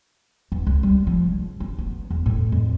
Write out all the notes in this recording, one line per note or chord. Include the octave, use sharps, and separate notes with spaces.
E2
C#2
G3
F3
C#3
C#4
B3
E2
A2
F2